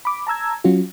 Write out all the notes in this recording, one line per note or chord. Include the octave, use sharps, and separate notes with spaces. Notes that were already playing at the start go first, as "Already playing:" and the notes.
B5 D6
A5 A#5 E6 G#6
F#3 C#4 F4 F#4